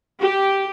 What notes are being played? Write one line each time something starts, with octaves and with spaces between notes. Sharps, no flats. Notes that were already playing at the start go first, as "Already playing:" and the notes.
G4